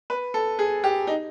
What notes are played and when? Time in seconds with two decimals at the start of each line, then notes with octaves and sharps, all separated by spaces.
0.10 B4
0.34 A4
0.59 G#4
0.84 G4
1.07 D#4